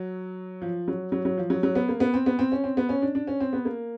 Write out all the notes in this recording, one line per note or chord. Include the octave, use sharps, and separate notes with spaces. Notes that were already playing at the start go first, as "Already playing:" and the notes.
Already playing: F#3
F3
F#3
F#3
F#3
F3
F#3
F#3
B3
A#3
B3
C4
B3
C4
C#4
C4
B3
C#4
D4
D4
C#4
C4
B3
A#3